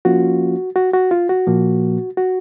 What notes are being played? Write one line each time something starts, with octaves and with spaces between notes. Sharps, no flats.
F3 A#3 C#4 F4 F#4
F#4
F#4
F4
F#4
A#2 F3 A#3
F#4